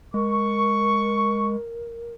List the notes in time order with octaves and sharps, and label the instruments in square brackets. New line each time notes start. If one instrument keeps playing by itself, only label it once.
[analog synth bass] G#3 [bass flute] A#4 [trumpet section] C#6